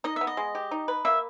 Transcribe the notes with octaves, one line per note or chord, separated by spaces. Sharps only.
D#4 D#5
B3 E5
D#5
G#3
G4
D#4
B4
A#3 E5